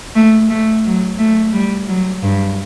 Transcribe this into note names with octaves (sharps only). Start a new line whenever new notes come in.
A3
A3
F#3
A3
G3
F#3
G2